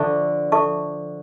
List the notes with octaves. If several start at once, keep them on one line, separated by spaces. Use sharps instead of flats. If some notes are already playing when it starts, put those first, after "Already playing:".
Already playing: D3 F3 A4 E5 A5 C#6
A4 E5 A5 C#6